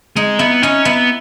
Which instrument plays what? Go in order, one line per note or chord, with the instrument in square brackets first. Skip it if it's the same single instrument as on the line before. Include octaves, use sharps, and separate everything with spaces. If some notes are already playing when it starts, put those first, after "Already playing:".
[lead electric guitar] G#3 [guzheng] D#4
[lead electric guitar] B3 [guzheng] E4
[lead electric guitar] C#4 [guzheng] D#4
[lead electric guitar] B3 [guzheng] E4